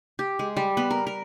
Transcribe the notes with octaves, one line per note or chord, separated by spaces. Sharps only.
G4
G#3
G3
B3
A#4
A#4